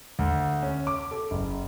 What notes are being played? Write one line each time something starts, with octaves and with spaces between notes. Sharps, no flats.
D2
C#4
D6
A4
F#1